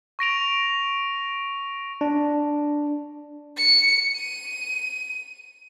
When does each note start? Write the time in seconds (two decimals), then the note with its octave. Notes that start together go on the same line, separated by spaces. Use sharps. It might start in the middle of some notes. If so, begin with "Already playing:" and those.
0.19 C#6 A#6 D7 F7
2.01 D4
3.57 C#7
4.16 D#7